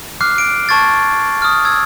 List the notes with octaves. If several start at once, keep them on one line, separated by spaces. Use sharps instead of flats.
D6 F6 F#6 C7
D7
A5 C#6 G#6 A6
D#6 F6
E6 G#6